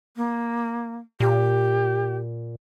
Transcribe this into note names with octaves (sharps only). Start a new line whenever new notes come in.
A#3
A#2 G4